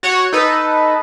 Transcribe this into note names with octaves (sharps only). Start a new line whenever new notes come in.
F#4 C#5 F#5
D#4 A4 B4